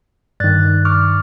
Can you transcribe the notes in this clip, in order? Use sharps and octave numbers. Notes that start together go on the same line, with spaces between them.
G2 D#3 D5 F#6 A6
C#6 D6 F6